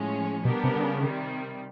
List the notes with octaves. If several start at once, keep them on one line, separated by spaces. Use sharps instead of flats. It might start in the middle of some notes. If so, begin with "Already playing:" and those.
Already playing: A2 F3 G#3 C#4
B2 G3 B3 D4 G4 A#4
C3
D3
C#3
C3 D#3 G3